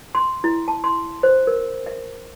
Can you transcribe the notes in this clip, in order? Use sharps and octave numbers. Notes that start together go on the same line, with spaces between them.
C6
E4
A5
C6
C5
A#4
E5